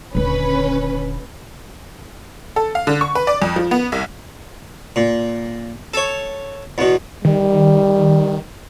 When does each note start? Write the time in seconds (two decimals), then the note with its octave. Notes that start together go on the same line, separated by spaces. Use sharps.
0.15 D#1 D3 C#4 B4
2.56 A4
2.75 F5
2.87 D3
3.01 C#6
3.15 B4
3.27 D5
3.42 F2
3.56 F3
3.71 B3
3.92 C2
4.96 A#2
5.94 A4 C#5
6.78 E2 B2
7.25 D#3 G3